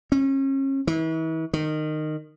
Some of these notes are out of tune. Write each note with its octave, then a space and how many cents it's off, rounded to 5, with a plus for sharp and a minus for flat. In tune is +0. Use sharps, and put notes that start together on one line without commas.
C#4 -35
E3 -40
D#3 -15